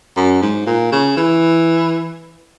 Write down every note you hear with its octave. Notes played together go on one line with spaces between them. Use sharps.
F#2
G#2
A#2
C#3
E3